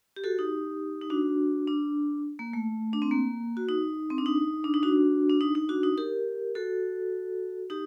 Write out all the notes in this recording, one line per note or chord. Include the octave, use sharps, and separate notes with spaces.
G4
F#4 A4
D#4 G4
D#4
D4 F#4
D4
A#3
A3
D4
C4
A#3
F#4
D#4
C4
D4
D#4
D4
D#4
D4 F#4
D4
D#4
D#4
D4 F#4
D#4
G4 A#4
F#4 A4
D#4 G4